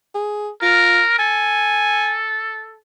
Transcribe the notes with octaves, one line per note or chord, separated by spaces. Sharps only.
G#4
F4 A#4
A4 G#5